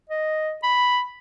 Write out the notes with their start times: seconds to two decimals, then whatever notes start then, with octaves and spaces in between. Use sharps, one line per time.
0.10 D#5
0.63 B5